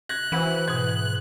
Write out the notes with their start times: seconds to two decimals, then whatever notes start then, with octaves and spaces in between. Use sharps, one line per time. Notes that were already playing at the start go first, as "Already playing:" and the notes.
0.09 F#6 G#6 A#6
0.32 E3 F#4 B4 C5
0.68 G#2 B2 G#6